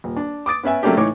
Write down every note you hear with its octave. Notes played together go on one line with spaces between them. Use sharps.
D#1
D4
D6 D#6 A6 D7
B3 C#4 B4 E5 G#5
F#3 A3 A#3 C#4 D4 G4
A2 E3 D#4 C#5 D6